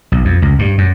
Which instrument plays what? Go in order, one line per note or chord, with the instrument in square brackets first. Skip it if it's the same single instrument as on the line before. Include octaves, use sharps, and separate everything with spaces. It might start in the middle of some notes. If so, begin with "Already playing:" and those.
[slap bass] B1
F2
C#2
G2
F#2